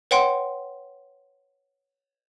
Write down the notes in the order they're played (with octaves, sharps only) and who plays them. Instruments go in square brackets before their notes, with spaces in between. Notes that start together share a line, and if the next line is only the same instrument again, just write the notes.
[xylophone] B4 C#5 F#5 G5 C6